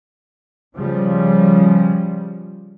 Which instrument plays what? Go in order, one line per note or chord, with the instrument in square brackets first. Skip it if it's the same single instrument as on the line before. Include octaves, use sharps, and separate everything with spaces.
[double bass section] C#3 F3 G3